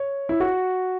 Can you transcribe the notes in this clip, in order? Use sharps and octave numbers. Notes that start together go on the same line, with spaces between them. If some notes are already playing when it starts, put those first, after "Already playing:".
Already playing: C#5
E4
F#4